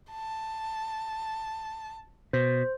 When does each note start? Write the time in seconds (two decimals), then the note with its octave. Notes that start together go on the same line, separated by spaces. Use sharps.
0.11 A5
2.33 B2 C5